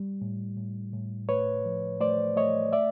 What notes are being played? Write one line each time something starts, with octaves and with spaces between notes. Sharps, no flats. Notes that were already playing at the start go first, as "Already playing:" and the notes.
Already playing: G3
A2
A2
A2
A3 B4 C#5
F3
A3 C5 D5
A3 C#5 D#5
D5 E5